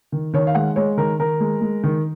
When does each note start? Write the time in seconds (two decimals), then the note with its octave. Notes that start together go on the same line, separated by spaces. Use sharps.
0.12 D#3
0.34 D#3 C#5
0.47 F5
0.55 G#3 F#5
0.76 G#3 C#5
0.97 D#3 A#4
1.19 D#3 A#4
1.40 G#3
1.61 G#3
1.84 D#3